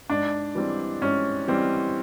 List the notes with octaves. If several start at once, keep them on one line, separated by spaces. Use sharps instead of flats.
G#2 D4
E3 G3 C4
G#2 C#4
E3 G3 C4